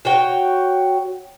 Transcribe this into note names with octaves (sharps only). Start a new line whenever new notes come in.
F#4 C#5 G5